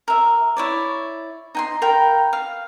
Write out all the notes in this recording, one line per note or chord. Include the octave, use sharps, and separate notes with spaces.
A#4 E5
E4 C#5 D5
D#4 G5 C6
A#4 F5 G5 B5
F5